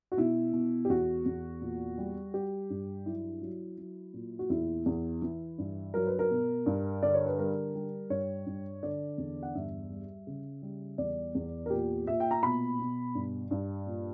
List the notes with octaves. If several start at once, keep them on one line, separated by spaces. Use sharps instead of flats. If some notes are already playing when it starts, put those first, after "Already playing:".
F#4
B2 E4
B2
G4
E2 F#4
E2
A#2
G3
G3 G4
G2
F#3 E4
F#3
F#3
A#2
F#4
E2 E4
E2
E3
G2
F#3 A#4
B4
A#4
B2
G2
D3 D5
C#5
B4
G3 A#4
G3
G2 C#5
G2
D3 D5
E2
F#5
G2 E5
G3
C#3
G3
E2 D5
E2
A#4
A#2 G4
A#2 E5
G5
A#5
B2 B5
B2
G2
G2
A#2